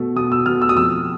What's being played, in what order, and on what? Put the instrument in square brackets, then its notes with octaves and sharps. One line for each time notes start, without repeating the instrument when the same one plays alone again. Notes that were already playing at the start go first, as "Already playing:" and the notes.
Already playing: [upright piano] B2 A3
B2 D#6
E6
B2 F6
E6
D#6
F2 E6